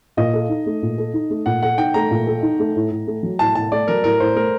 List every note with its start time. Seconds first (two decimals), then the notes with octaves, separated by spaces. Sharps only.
0.17 A#2 D#5
0.34 A4
0.49 D#4
0.66 A3
0.82 A#2
0.98 A4
1.14 D#4
1.30 A3
1.46 A#2 F#5
1.63 A4 F#5
1.78 D#4 G5
1.94 A3 A#5
2.11 A#2
2.27 A4
2.43 D#4
2.59 A3
2.76 A2
2.91 A2
3.07 A3
3.23 F#3
3.39 A2 A5
3.55 A2 A5
3.72 A3 D5
3.88 F#3 A#4
4.04 A2 A#4
4.20 A2 C5
4.36 A3 A#4